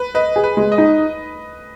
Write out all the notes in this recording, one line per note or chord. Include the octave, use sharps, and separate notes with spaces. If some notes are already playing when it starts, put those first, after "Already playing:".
Already playing: B4
B4 D#5
G#4
B4
G#3
D#5
D#4